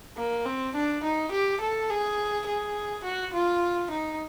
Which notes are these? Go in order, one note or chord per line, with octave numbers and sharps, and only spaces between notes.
A#3
C4
D4
D#4
G4
A4
G#4
G#4
F#4
F4
D#4